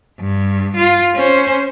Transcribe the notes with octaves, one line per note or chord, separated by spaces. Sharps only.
G2
F4
C#4 C5